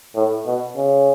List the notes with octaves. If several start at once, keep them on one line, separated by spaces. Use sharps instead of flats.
A2
B2
C#3